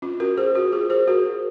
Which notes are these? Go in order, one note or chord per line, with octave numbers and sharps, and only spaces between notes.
C#4 F4
F#4 A#4
G#4 C5
F#4 A#4
F4 G#4
G#4 C5
F#4 A#4